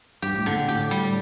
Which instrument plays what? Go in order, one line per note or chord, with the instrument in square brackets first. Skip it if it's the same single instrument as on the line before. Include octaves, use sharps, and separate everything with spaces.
[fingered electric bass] G2 [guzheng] G4
[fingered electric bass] A2
[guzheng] D3
[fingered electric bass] A#2
[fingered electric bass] A2 [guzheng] G4
[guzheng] G3